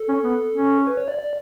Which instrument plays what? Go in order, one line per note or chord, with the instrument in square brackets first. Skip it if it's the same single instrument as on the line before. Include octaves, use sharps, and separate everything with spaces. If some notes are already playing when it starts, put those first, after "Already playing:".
Already playing: [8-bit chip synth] A4
[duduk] C#4
B3
C#4
[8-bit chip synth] B4
C#5
D5
D5